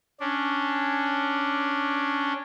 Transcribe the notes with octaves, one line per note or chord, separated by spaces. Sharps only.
C#4 D4